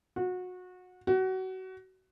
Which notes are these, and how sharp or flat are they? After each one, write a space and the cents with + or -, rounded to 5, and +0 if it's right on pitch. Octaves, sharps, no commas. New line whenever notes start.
F#4 -25
F#4 +25